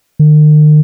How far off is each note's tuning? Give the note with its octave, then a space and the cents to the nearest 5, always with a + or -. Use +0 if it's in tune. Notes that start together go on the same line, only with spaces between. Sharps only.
D#3 -45